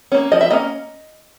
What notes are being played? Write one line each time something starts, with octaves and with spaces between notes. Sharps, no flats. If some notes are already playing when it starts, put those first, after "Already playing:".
A#3 C#4
F3 D#5
E5
A#3 C#4 D#5